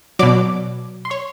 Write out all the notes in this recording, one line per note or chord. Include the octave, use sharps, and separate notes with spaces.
B2 F#3 D5 D6
C6
C#5 C#6